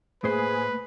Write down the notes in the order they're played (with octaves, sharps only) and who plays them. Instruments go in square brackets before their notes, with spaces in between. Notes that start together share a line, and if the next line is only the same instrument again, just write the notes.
[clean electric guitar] A2 C5 [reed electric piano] A3 A#3 [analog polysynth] G#4 [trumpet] B4